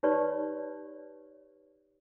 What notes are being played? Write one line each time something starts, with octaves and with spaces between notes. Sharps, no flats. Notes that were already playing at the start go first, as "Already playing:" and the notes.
D#4 G4 B4 C#5 D5 B5